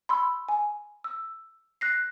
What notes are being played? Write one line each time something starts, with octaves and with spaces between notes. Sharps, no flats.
B5 C6 E6
G#5
E6
F#6 A#6 C7